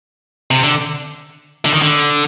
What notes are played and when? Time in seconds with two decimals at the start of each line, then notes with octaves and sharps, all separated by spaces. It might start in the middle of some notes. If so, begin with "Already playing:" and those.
0.51 C3
0.63 D3
1.65 D3
1.73 D#3
1.82 D3